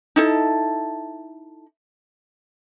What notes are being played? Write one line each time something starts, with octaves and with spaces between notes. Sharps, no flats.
D#4 E4 A4